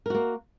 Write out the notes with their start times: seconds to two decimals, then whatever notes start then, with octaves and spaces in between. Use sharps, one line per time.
0.06 A#4
0.10 F#4
0.15 A#3